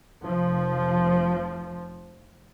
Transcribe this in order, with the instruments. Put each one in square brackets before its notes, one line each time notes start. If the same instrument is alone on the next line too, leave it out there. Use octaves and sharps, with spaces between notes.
[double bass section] F1 F3